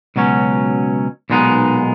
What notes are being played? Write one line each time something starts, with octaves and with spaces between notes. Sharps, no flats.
C#2 B2 F#3 C#4
B1 A#2 G#3 B3 D#4